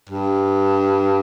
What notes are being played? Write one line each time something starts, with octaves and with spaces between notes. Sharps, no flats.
G2